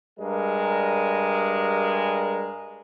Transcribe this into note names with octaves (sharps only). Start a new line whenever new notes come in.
G2 G3 G#3 A#4